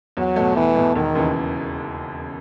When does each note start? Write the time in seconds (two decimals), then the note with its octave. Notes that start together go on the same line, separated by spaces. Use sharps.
0.17 E2 F#3
0.36 B2 A3
0.56 E2 E3
0.75 B2 A3
0.96 E1 D#3
1.15 D#2 C#3 E3